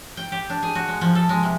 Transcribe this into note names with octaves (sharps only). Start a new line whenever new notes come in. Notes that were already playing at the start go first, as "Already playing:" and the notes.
G5
G4
D4
G#4
F#4
G#3
F3
A4
G#3
C3